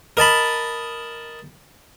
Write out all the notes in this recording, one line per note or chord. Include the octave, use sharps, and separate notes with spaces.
A#4 D#5 A5 B5